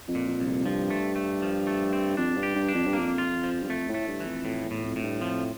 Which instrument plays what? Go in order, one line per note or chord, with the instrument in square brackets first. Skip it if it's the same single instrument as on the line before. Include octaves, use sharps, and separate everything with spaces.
[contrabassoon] F2
[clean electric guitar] A#2
[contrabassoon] F2
[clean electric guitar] C2
[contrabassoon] F2
[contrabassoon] G2 [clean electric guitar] F3
[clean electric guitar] A3
A3
F3
A3
C4
[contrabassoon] F2 [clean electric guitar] D4
[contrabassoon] G2
[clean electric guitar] G4
[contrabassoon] G2
[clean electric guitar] D4
[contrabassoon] F2
G2
[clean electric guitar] A#3
[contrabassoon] F2
[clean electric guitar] F4
F3
[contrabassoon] G2
[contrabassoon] F2 [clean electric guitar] A3
[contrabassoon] A2
[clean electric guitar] A3
[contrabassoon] G2
[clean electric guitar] E3
[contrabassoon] F2
[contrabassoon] F2 [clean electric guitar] A2
[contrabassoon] E2
[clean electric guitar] A2
[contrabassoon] F2
[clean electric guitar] A2
[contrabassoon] G2
[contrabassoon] F2 [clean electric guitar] F3